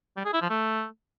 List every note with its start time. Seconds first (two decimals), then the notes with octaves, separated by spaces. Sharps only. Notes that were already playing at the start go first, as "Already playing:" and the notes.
0.17 G3
0.25 G#4
0.33 E4
0.41 F3
0.50 A3